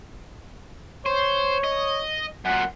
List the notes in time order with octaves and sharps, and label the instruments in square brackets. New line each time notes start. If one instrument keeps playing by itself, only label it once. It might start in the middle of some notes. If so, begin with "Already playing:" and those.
[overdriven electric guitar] C5 [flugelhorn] C#5
[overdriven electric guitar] D#5
[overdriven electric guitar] F#2 A#2 [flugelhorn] F#5